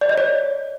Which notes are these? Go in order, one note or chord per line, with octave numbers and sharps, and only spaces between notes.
D5
D#5
C#5